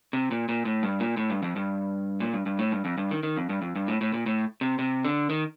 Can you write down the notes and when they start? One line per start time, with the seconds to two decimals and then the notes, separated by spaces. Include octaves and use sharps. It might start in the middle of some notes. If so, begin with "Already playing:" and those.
0.13 C3
0.31 A#2
0.49 A#2
0.65 A2
0.83 G2
1.00 A#2
1.17 A2
1.30 G2
1.43 F2
1.56 G2
2.20 A#2
2.33 G2
2.46 G2
2.59 A2
2.72 G2
2.85 F2
2.98 G2
3.11 D#3
3.23 D#3
3.37 F2
3.49 G2
3.62 F2
3.76 G2
3.88 A2
4.01 A2
4.14 A#2
4.26 A2
4.61 C3
4.79 C3
5.05 D3
5.30 D#3